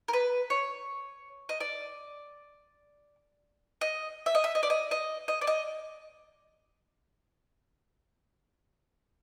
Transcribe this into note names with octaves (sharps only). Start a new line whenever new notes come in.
A#4
B4
C#5
D#5
D5
D#5
E5
D#5
E5
D#5
D5
D#5
D#5
D#5
D5
D#5